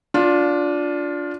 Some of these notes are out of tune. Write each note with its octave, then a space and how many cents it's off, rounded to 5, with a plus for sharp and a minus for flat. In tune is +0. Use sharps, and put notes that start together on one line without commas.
D4 -10 F4 +20